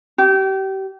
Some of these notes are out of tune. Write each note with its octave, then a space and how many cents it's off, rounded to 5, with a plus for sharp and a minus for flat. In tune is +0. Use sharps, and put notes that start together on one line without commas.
G4 -30